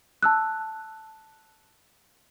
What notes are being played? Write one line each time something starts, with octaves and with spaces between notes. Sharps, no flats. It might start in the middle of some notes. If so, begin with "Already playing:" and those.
A5 E6 F#6